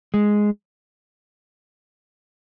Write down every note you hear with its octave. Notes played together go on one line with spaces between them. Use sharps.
G#3